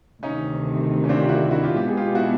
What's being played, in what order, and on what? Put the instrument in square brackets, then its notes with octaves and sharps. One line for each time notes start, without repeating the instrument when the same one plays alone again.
[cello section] D2 C3 D#3 [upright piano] C#4 D#4
[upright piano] C#4
C4 D4
F4 G4
E4 F#4
E4 F#4
F4 G4
[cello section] B2 G#3 B3 D4 [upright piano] G4
[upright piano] G#4
F4 G4
E4 F#4